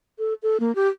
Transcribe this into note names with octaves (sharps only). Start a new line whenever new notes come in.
A4
A4
A#3
G4